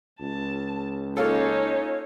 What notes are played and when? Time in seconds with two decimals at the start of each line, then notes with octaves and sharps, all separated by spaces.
0.20 C#2 A5
1.17 A#3 C#4 D#4 F4 A4 C#5